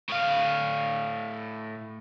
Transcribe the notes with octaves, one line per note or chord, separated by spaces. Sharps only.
A2 F5